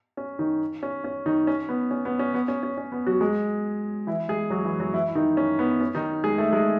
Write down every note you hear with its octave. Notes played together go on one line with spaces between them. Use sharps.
C#4
D#3 D#4
C#4
C#4
D#3 D#4
C#4
B3
C#4
B3
C#4
B3
C#4
C#4
C#4
B3
F#3 F#4
G#3 G#4
E3 E4
G#3 G#4
F#3 F#4
E3 E4
F#3 F#4
E3 E4
E4
D#3 D#4
C#4
B3
C#4
D#3 D#4
G#3 G#4
A3 A4
G#3 G#4